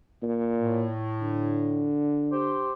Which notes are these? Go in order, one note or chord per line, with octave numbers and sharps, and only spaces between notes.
A#2
A2
D3
G4 C5